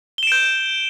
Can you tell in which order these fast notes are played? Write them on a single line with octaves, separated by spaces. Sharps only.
G7 E7 D7 G6